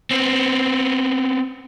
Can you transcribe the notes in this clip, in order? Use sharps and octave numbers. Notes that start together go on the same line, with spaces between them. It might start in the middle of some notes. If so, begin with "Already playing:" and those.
B3 C4